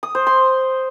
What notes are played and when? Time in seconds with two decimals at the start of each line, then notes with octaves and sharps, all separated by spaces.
0.03 D#6
0.15 C5
0.27 C6